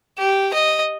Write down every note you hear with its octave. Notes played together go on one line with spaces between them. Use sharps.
G4
D#5